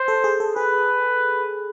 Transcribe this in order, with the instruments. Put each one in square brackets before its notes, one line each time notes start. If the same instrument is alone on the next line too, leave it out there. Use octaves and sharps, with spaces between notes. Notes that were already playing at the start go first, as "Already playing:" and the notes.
Already playing: [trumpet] C5
[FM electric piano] A4
G#4
A4
[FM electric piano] G#4 [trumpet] B4